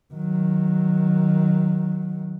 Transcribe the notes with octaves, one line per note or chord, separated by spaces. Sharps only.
D#3 F#3